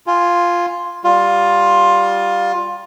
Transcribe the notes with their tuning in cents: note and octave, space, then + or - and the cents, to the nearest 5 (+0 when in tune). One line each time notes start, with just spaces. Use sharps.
F4 +0 G#5 +0
G3 +0 F4 +15